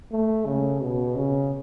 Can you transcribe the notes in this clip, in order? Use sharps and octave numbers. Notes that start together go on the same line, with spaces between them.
A3
C#3
B2
C#3